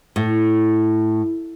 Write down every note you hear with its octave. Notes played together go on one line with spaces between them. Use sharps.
A2